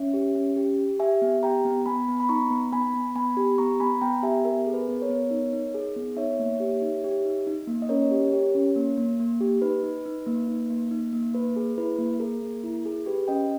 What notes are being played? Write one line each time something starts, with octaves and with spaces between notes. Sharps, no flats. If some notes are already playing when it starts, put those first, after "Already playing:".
Already playing: C#4 C#5 E5
G4
C#4
G4
G4
G4 E5 G#5
B3
G4 G5 A#5
B3
B3 G#5 B5
B3
B5
D#4 A#5 C#6
B3
B3 G#5 B5
B3
B3 G#5 B5
G4
B3 A#5 C#6
B3 G#5 B5
B3 G5 A#5
G4 E5 G#5
B3 A#4
G#4
B4
B3
A#4 C#5
B3
D#4
D#4
G#4
B3
D#4 C#5 E5
A#3
G4
D#4
G4
D#4
D#4
A#3
D#5
C#4 A#4 C#5
G4
G4
C#4
A#3
A#3
A#3
G4
D#4 B4
D#4
D#4
A#3
D#4
A#3
D#4
A#3
A#3 B4
G#4
E4 B4
A#3
G#4 A#4
A#3
E4
G#4
G4 B4
C#4 D#5 G5